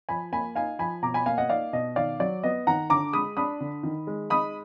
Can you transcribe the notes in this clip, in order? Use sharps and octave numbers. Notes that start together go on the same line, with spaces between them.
F3 G#5 B5
A#3 G#5 B5
D#4 F5 G#5
F3 G#5 B5
B2 A#5 D6
G#5 B5
A#3 F5 G#5
D#5 F#5
D#4 D5 F5
B2 D#5
D#3 D5 F5
F#3 D5
B3 D#5
D#3 F#5 A#5
D3 A#5 D6
G#3 B5 D#6
D4 B5 D#6
D3
D#3
G#3
D#4 B5 D#6